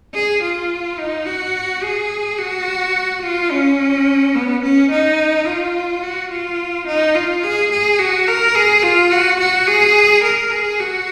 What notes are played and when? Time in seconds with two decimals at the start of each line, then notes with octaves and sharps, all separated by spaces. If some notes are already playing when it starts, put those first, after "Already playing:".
0.14 G#4
0.43 F4
0.98 D#4
1.26 F#4
1.82 G#4
2.39 F#4
3.22 F4
3.51 C#4
4.35 B3
4.63 C#4
4.91 D#4
5.47 F4
6.03 F#4
6.31 F4
6.87 D#4
7.15 F4
7.43 G#4
7.71 G#4
7.99 F#4
8.28 A#4
8.55 G#4
8.83 F4
9.11 F#4
9.39 F#4
9.67 G#4
10.24 A#4
10.51 G#4
10.80 F#4